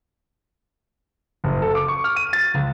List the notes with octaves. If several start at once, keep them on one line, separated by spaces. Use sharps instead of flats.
F#1
A4
D6
C#6
F6
D#7
A6
C#2